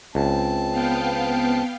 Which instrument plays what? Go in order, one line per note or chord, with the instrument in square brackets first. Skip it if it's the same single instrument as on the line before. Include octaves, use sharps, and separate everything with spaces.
[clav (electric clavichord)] C#2 [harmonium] C4 A5
[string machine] B3 F5 G5